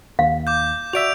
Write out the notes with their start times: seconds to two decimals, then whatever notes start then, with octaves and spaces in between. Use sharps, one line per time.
0.19 D#2 F5
0.47 D6 G6
0.93 F#4 D5 E5 D7 F7